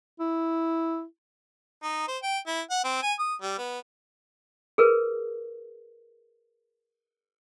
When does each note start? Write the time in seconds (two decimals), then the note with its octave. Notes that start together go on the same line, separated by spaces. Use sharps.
0.20 E4
1.83 D#4
2.08 C5
2.23 G5
2.47 E4
2.70 F#5
2.84 C4
3.03 G#5
3.19 D#6
3.42 G3
3.58 B3
4.78 G#4 A#4 B4